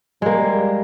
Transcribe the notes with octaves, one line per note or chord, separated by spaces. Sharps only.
G3 G#3 A#3